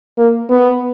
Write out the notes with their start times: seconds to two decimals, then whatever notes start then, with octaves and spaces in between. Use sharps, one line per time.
0.18 A#3
0.50 B3